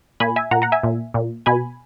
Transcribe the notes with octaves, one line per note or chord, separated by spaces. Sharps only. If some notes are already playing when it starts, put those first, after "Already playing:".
A#2 G#5 B5
E5 G#5
A#2 F#5 A#5
F#5 A#5
E5 G#5
A#2
A#2
B2 G#5 B5